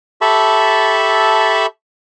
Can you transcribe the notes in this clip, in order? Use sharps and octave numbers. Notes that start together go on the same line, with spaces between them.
G4 A4 E5 A5 B5 C#6